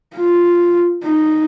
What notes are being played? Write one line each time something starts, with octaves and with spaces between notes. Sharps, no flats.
F4
D#4